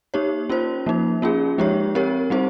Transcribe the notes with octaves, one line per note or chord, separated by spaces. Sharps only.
A#3 D#4 G4 C#5
C#4 F4 C5
F3 A#3 D#4
A#3 C#4 F4 G#4
F3 G#3 D#4 G4 C#5
C4 G4 A#4 C#5
G3 C4 D#4 G4 C5